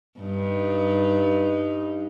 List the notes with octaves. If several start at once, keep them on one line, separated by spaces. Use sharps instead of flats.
G2 D#4